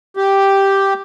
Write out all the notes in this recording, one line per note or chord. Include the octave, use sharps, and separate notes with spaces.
G4